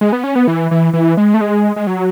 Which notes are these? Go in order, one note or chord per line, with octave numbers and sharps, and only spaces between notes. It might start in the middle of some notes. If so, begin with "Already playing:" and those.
G#3
B3
C#4
B3
E3
E3
E3
G#3
A3
G#3
G#3
F#3